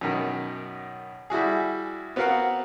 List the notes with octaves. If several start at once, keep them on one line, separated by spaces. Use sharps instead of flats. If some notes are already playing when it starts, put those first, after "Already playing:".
F#2 B2 D#3
G3 E4 F#4 G#4
B3 C4 F#4 A#4 F5 F#5